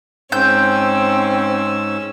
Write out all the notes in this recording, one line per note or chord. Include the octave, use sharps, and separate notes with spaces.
G#2 C4 C#4 E6 G6